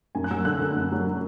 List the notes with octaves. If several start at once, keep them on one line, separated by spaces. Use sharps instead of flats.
F#2 G#5
F#6
F#3 E6
D3 F#6
A3
F#2
F#3